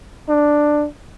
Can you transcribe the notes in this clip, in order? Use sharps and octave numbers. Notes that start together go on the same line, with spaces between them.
D4